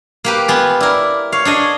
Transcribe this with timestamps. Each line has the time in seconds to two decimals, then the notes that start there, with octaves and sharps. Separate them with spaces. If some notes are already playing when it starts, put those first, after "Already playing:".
0.24 A#3 G4 B4
0.48 B3 F4 G#5
0.81 E4 A#4 D5
1.32 C#5 F5
1.45 D4 G#4 D#5